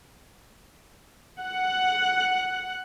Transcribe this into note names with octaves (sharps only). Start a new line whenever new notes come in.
F#5